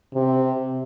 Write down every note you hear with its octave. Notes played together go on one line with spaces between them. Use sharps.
C3